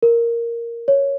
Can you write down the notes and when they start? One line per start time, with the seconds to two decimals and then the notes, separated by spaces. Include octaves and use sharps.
0.03 A#4
0.88 C#5